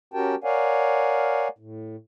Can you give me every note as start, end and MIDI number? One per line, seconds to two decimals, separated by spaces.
0.14 0.35 61
0.14 0.35 66
0.14 0.35 67
0.14 0.35 70
0.14 0.35 79
0.14 0.35 81
0.44 1.48 70
0.44 1.48 73
0.44 1.48 74
0.44 1.48 77
0.44 1.48 78
0.44 1.48 80
1.59 1.96 45